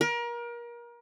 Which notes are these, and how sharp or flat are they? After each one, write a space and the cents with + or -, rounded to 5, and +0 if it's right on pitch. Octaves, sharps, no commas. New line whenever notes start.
A#4 +30